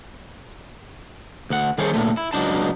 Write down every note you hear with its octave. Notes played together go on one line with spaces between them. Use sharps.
D2 F#5
D#3 G3 G#4 A4 C5 C#5
A#2 D3 A3
E4
C#2 C#3 F#3 D4 D#4 A5